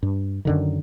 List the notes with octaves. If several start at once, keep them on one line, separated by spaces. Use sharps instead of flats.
G2
F#2 D3 D#3